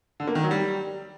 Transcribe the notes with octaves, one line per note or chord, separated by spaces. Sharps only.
D3
A#3
D#3
F#3
G3